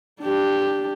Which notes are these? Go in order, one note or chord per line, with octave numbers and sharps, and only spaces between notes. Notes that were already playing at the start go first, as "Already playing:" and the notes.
D4 G4